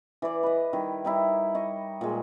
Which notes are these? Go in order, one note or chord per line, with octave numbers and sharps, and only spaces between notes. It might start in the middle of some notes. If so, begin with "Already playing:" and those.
E3 E4 D5
B4 D#5
D#3 G3 E4
G3 D#4 E4 C#5
D#5 C#6
A#2 G#3